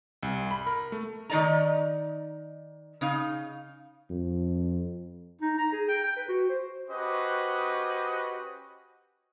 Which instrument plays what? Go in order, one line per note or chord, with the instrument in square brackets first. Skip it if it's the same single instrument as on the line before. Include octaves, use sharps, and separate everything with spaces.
[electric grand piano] C2
B5
A#4
A3
[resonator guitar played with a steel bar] D#3 D#4 D5 D#5 A#5
C#3 D#4 F5
[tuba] F2
[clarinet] D#4
A#5
G#4
G5
G5
B4
F#4
C5
[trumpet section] C#4 F#4 G4 B4 C5 D#5